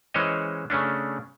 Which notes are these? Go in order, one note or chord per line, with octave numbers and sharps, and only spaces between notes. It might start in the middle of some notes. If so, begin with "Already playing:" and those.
E3 G#3 C#4 C5 C#5 D#5
C#3 A3 C#4 D4